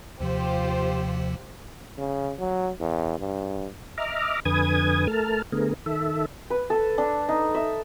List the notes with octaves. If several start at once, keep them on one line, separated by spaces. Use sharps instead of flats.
D#2 C3 F3 F4 G4 C5
C#3
F#3
E2
G2
D#5 E5 A#5 D6 F6
F2 D3 B4 G#5 D#6 G#6
A3 A4 A#4 A5 F6
D3 A3 B3 G#4 A#4
D#3 A4 E5
B4
A4
D4
D#4
E5